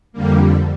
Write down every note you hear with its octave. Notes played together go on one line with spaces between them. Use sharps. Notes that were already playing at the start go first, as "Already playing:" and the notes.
F2 D3 G3 A#3